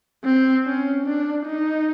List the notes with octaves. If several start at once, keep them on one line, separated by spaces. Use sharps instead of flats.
C4
C#4
D4
D#4